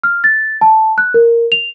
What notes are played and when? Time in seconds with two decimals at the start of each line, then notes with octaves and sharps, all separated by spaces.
0.04 F6
0.24 A6
0.61 A5
0.98 F#6
1.14 A#4
1.52 F7